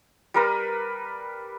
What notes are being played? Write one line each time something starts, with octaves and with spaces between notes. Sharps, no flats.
G3 A#4 B4